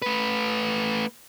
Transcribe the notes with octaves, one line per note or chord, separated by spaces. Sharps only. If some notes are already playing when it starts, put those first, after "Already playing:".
A3 B4